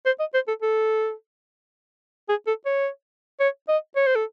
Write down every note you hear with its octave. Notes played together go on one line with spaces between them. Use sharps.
C5
D#5
C5
A4
A4
G#4
A4
C#5
C#5
D#5
C#5
C5
A4